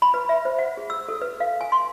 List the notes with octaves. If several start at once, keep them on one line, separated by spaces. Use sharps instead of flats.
B5
B4
E5
C5
F#5
G#4
E6
A4
B4
F5
G#5
C6